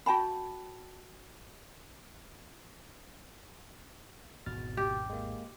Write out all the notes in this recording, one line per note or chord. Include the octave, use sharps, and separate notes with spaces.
F#4 G5 A5 B5
G#1 E2 B2 F6 A6
G4
G#3 A#3